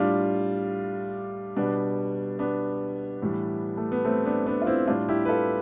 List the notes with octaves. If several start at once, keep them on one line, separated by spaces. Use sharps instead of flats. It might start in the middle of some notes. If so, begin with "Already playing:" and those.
Already playing: A2 G3 D4 F4
B2 G3 B3 D4
B3 D4
A2 E3 G3
A3
B3
A3 C4
B3 D4
B3 D4
F4
C4 E4
A2 G3 D4 F4
E4 G4
B4
F4 A4